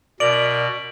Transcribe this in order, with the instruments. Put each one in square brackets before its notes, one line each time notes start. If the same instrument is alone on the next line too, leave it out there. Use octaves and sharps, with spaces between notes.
[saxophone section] F#2 A#4 [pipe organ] B2 [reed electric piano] D5 [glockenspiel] D7 F#7